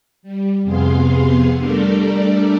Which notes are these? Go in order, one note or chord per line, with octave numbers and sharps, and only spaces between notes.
G3
F2 C3 B3 G#4 F5 C6
G3 A3 D4 A4 A#4 D5